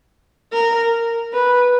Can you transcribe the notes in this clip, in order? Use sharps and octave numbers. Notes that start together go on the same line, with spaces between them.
A#4
B4